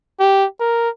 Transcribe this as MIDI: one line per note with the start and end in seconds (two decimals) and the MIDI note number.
0.20 0.45 67
0.60 0.89 70